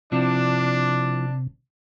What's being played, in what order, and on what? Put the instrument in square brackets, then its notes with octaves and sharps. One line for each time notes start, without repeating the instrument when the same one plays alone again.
[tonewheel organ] C3 [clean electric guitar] F3 C4 E4 [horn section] D4